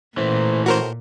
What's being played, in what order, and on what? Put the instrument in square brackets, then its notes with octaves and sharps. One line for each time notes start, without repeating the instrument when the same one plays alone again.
[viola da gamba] A#2 [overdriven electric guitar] E3 A3 [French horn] C5
[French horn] A2 [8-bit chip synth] F#4 A#4 C5